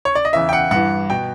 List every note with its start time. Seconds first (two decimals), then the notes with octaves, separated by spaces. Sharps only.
0.05 C#5
0.15 D5
0.25 D#5
0.33 E2 C#3 E3 E5
0.49 G5
0.53 F#5
0.71 G2 E3 F#5
1.10 B2 G5